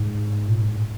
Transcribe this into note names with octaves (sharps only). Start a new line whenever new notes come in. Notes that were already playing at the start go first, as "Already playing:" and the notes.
Already playing: G#2
A#2
G#2